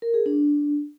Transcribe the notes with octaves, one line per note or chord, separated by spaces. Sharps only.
A#4
G#4
D4